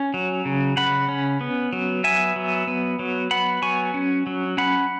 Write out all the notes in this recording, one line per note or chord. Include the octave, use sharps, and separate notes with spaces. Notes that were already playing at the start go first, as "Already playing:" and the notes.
Already playing: C#4
F#3
C#3
C#3 F#5 B5
C#4
B3
F#3
B3 E5 G#5
F#3
B3
F#3
B3 F#5 B5
F#3 G#5 C#6
C#4
F#3
C#4 F#5 B5